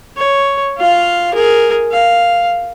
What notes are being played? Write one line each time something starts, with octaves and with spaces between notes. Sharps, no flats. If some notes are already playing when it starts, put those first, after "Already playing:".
C#5
F4 F5
G#4 A#4
F5